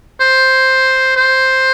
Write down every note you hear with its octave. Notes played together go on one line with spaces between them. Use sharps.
C5
C5